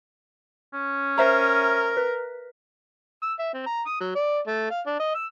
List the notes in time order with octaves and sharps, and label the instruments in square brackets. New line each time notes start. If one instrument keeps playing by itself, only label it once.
[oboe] C#4
[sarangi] A#4 [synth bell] C5 E5 A#5
[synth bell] B4
[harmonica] E6
E5
C4
A#5
D#6
F#3
D5
A3
F5
D4
D#5
E6